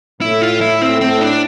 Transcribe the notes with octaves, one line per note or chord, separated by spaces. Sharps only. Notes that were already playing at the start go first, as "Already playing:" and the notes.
A2 E4
F4
E4
A2 C4
C4
D4